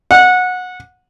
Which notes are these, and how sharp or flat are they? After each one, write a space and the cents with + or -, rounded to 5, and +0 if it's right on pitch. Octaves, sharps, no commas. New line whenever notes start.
F#5 -20